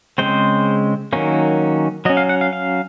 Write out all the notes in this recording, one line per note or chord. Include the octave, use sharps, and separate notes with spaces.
C#3 G#3 C4 C5
D#3 F#3 A#3 C#4
F#3 C#4 D#5
F5
F#5
F5
F5